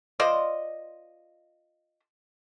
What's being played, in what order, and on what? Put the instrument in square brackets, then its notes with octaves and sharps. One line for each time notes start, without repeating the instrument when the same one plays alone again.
[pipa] F4 C5 D5 D#5